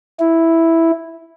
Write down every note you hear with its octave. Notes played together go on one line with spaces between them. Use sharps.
E4